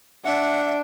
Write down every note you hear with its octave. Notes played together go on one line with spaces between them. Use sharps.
D4 E5 F#5